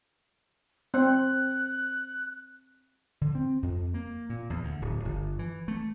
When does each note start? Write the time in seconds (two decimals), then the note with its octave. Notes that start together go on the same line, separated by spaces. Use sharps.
0.94 C4 F#6
3.21 D3
3.35 C4
3.63 F2
3.94 A#3
4.30 A#2
4.50 E2
4.63 D2
4.82 D1
5.05 G1
5.39 E3
5.68 A3